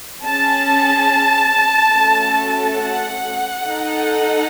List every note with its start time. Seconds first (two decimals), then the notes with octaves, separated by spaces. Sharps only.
0.25 C#4 G#4 A5
1.94 A3 C#4 F#4 A4
2.79 F#5
3.64 D#4 A4